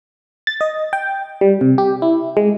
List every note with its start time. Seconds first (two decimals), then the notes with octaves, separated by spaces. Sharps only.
0.47 A6
0.61 D#5
0.93 G5
1.41 G3
1.61 C3
1.78 G4
2.02 E4
2.37 G#3